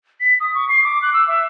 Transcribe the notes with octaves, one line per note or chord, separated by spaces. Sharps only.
B6
D#6
C#6
C7
D6
F#6
E6
E5